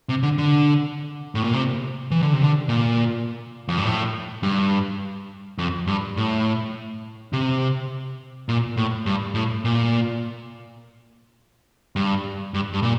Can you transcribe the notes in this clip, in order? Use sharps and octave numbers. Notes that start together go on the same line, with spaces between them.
C3
D3
D3
A2
A#2
C3
E3
D3
C3
D3
A#2
F2
G2
A2
G2
F2
G2
A2
C3
A#2
A2
G2
A2
A#2
G2
G2
G2
A#2